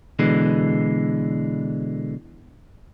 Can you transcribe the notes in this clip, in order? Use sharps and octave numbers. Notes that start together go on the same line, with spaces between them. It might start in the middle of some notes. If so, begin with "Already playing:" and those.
B2 D3 E3 G#3